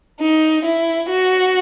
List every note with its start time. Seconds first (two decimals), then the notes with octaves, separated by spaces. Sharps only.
0.21 D#4
0.65 E4
1.11 F#4